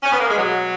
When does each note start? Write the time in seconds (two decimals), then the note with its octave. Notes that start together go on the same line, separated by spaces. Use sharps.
0.03 C#4
0.12 B3
0.20 A#3
0.28 G#3
0.37 B2 F#3